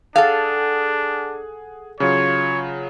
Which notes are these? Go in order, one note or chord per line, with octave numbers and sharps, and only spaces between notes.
D4 G#4 A4 F5 F#5
C#3 F#3 F4 C#5